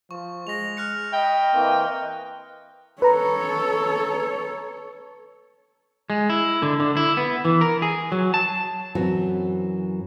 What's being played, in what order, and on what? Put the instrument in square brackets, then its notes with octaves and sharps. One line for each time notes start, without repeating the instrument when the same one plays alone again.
[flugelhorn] F3 [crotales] C#6
[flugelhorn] G#3 [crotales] A#6 F7
[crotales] F6 F#6 C#7
[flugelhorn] D#5 [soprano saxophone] G5 [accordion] B5
[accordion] E3 A#3 C4
[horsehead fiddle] A4 C#5 [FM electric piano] B4 A#5
[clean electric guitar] G#3
E4
D3
D3
E4
B3
E3
A#4
G#4
F#3
A5
[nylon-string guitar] F#2 E3 F#3 C4 F#4